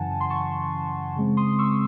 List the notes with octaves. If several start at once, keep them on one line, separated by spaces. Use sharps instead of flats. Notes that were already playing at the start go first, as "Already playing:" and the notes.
Already playing: F#2 C#3 E3 F#5 G#5 A5
A5
C6
A5 C#6
C#3 G#3 C4
C6 D#6
C#6 E6